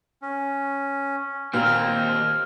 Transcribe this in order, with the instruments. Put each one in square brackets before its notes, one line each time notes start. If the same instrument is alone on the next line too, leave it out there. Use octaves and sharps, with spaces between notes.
[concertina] C#4
[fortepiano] A#2 [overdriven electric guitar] D#3 A#3 [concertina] C4 [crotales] F6